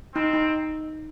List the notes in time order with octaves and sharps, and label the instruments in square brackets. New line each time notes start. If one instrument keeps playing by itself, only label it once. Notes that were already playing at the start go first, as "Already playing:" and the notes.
[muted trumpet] C4 [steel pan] D#4
[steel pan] D#4